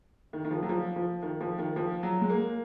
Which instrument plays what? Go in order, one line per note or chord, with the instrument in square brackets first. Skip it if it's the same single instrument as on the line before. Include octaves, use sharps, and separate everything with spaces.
[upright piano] D#3
D#3
F3
F#3
F3
F3
D#3
F3
D#3
F3
F#3
G#3
A#3